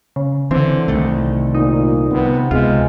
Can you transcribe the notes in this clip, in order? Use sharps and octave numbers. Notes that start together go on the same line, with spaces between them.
C#3
D3 E3 C4
C2 D#3 A3
A#2 D#4
C3 B3
C#2 C3 G#3 F4